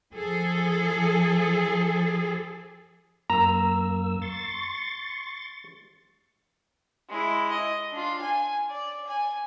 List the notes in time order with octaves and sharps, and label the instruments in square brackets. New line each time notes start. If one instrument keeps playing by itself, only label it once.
[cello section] F3 G#4 A4
[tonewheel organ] F#2 A#3 E6 [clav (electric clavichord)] A#5
[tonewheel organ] C6 C#6 A6
[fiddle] G#3 E4
D#5
D4 F4
G#5
D5
G#5